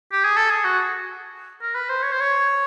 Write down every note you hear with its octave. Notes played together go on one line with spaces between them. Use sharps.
G4
G#4
A4
G#4
F#4
A#4
B4
C5
C#5
C5
C#5